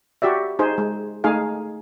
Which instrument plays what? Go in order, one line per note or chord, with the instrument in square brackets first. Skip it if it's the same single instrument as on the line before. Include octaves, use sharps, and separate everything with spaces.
[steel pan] F#4 G4 D5 E5
D#4 G#4 C5
G#3
A3 D#4 G#4 F5